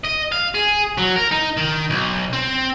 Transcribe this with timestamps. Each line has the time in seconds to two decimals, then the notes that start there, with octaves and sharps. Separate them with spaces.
0.05 D#5
0.32 F5
0.54 G#4
0.98 F#3
1.16 A#4
1.31 D#4
1.57 D#3
1.90 B1
2.33 C4